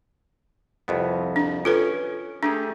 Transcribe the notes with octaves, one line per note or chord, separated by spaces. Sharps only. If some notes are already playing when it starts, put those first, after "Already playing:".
C2 F2 B3
D4
C#4 F4 A4 B4
A3 D4 G4 G#4